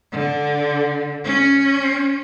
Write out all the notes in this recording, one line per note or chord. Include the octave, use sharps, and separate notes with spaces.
D3
C#4